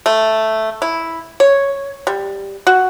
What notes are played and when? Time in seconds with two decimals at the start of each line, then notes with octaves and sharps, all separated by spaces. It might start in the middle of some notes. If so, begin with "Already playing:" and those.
0.06 A3
0.82 E4
1.40 C#5
2.07 G3
2.67 F#4